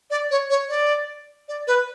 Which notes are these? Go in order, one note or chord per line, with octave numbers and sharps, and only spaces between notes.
D5
C#5
C#5
D5
D5
B4